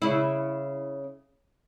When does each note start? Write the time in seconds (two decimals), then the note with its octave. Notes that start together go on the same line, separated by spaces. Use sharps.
0.02 C#3 E4